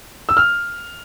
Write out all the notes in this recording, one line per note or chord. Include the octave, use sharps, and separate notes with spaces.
E6
F6